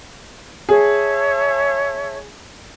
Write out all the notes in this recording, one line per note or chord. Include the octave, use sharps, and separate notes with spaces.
G#4 C#5 E5 A5